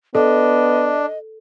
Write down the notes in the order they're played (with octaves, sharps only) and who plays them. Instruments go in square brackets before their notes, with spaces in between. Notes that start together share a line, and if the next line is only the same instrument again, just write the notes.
[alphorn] B3 [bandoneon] D4 [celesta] A4 [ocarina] D#5